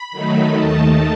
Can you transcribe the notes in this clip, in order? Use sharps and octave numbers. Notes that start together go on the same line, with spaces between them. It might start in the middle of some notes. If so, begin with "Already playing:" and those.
Already playing: B5
D#3 F#3 A3 D#4
D#2 D#3 A3 D#4 A5